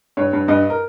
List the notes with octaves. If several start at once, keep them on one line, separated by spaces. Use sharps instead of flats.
G2 C#5
G2
G2 D#5
A#4